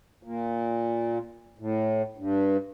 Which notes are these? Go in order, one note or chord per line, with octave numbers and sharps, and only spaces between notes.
A#2
A2
G2